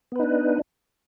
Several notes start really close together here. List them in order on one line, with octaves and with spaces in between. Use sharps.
B3 B4 D#4 D4